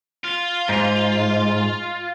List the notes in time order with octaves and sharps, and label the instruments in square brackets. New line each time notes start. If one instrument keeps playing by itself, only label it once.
[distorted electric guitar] F4
[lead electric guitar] G#2